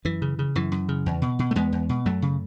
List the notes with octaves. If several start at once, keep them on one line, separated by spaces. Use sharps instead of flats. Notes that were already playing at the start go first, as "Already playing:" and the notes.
F#2 E3
C#3
C#3
F#2 E3
F#2
C#3
E2
B2
B2
A3
E2 G#3 B3
E2
B2
F#2 F#3 A3
C#3